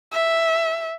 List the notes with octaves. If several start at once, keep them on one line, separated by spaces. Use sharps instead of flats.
E5